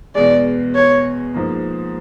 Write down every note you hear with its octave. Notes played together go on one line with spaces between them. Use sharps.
E2 B2 G#3 D5
C#5
G#2 F3 A#3